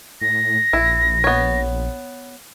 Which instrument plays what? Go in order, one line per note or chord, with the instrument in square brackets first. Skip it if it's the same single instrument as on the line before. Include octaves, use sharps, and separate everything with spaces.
[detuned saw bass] A2 [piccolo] A#6
[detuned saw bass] A#1 [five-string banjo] E4
[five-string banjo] B3 C#5